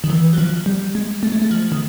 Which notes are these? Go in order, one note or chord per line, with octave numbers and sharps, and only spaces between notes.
D#3
E3
F#3
F3
G3
G#3
A3
G#3
A3
F3
D#3